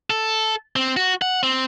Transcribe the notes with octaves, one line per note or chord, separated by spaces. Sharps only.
A4
C4
F#4
F#5
C4